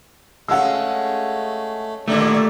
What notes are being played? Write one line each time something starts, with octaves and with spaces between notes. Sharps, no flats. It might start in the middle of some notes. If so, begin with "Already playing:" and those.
G#3 A3 C#4 F5 F#5 E6
A#2 D3 D#3 A3 A#3 G4 D5